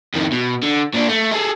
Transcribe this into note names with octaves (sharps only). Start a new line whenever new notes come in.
F2 D#3
B2
D3
A#2 D4
A3
G#4 A4